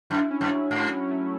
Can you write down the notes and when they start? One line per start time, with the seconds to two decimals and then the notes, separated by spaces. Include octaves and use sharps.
0.10 F#2 E4
0.31 C#4
0.41 F#2
0.50 F#3
0.71 G#2 F#3
0.91 C#4
1.11 A3